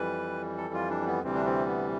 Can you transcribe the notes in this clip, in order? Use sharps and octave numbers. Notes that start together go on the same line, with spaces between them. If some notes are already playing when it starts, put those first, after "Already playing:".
Already playing: F2 E3 G3 B4
A4
F4
D4
B3
D2 C3 E3 G3 C4
D4
C4
B3